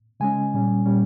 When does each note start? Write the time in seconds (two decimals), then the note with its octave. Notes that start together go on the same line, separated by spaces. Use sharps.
0.20 C#3 G#3 C#4 G#5
0.54 A#2 G3 C#4
0.86 A#2 G3 C#4